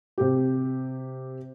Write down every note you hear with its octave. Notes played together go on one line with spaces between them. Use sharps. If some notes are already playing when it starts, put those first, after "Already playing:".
C3 G4